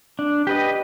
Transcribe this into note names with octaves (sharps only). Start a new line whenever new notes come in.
D4
G4 B4 D#5